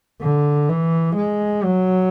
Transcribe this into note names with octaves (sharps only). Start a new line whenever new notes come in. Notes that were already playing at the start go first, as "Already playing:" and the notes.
D3
E3
G#3
F#3